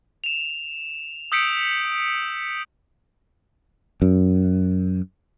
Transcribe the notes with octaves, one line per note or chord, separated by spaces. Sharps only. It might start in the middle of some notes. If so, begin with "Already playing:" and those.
E7 F7
D#6 E6 G6 B6 C#7 D7
F#2